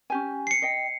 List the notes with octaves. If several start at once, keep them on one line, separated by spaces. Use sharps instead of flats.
C#4 G4 G#5
C7 C#7
D#5 G5